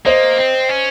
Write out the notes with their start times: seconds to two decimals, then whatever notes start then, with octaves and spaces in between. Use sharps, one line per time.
0.05 A#3 C5 D#5
0.38 C4
0.69 C#4